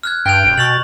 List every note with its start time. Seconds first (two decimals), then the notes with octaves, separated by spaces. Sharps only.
0.03 F6 F#6 G#6
0.26 G2 G5 G6 D7 F7
0.46 E1
0.58 B2 C#6 A6 F7 F#7